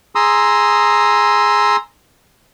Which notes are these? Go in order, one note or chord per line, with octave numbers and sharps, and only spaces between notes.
G#4 A#5 C6 D#6 E6